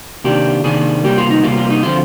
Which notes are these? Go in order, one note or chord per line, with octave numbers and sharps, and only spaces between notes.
C3 D#3 A#3 D4 G4
C3 D#3 A#3 D4 G#4
C3 G3 A#3 G4
F4
D#4
C3 G3 A#3 F4
F4
D#4
D3 F3 C4 F4